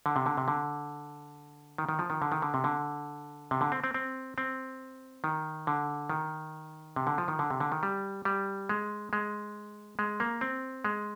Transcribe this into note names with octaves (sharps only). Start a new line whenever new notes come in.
D3
C3
D3
C3
D3
D#3
D#3
F3
D#3
D3
D#3
D3
C3
D3
C3
D3
C4
C4
C4
C4
D#3
D3
D#3
C3
D3
F3
D#3
D3
C3
D3
D#3
G3
G3
G#3
G#3
G#3
A#3
C4
G#3